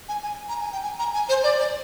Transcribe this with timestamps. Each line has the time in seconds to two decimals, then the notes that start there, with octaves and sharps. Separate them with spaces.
0.09 G#5
0.23 G#5
0.49 A#5
0.61 G#5
0.73 G5
0.83 G#5
0.99 A#5
1.14 G#5
1.29 C5
1.43 D5
1.59 D5